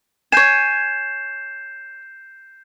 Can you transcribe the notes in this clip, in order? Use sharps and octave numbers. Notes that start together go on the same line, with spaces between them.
C#5 G#5 G6 C7 E7